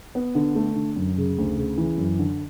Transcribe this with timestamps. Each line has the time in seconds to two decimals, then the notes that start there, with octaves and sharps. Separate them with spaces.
0.15 B3
0.35 D3
0.55 A3
0.76 D3
0.96 F#2
1.18 C#3
1.38 D2
1.58 C#3
1.78 E3
1.98 F#2
2.19 D3